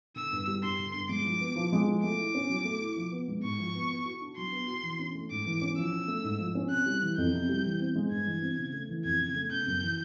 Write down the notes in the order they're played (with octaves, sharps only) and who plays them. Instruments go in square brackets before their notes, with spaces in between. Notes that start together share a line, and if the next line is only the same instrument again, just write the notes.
[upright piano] D3 [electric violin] E6
[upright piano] G2
G3
[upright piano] G2 [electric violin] C6
[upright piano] D3
G2
[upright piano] G#3 [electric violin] D6
[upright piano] F3
B3
F3
G#3
F3
[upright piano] A3 [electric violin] D6
[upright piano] E4
C#4
F#3
A3
E4
F3
B3
G#3
[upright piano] G#2 [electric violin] C#6
[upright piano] F3
B3
B3
F#4
D4
[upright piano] F#3 [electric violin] C6
[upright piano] B3
F#4
E3
C#4
A3
[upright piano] G#2 [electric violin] D6
[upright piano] E3
C#4
[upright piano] F3 [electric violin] E6
[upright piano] C#4
A3
G#2
F3
C#4
[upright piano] C3 [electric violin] F#6
[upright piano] G3
E3
[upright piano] F2 [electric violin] G6
[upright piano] C3
G3
E3
C4
G#3
[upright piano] G2 [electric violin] G#6
[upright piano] E3
C4
C#3
A3
E3
[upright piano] F2 [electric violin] G#6
[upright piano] C#3
A3
[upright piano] C#3 [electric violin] G6
[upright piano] F#2
E3